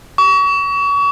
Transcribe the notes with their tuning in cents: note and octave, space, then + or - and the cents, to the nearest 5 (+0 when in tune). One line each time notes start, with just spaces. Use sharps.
C#6 +35